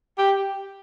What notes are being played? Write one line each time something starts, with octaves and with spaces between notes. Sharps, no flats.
G4